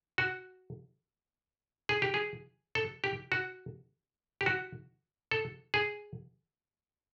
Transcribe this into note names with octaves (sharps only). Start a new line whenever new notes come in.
F#4
G#4
G4
G#4
A4
G4
F#4
G4
F#4
A4
G#4